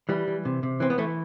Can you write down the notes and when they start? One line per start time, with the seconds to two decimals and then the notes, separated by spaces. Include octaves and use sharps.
0.09 E3 G3
0.27 E3
0.45 C3
0.63 C3
0.80 E3 C4
0.90 B3
0.98 E3 A3